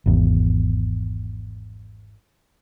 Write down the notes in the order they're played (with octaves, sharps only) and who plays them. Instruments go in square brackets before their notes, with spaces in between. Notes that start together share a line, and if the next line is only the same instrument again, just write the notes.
[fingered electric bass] G#1 E2